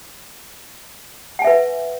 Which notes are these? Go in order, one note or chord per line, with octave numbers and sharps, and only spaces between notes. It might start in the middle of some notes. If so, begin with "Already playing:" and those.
B4 E5 F#5 G#5